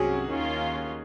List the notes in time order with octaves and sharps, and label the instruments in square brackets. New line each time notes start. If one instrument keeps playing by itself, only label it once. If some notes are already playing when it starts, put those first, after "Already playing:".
Already playing: [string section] C2 C3 F#3 C#4 [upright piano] F#4 G#4
[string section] D#2 D#3 A#3 C#4 F4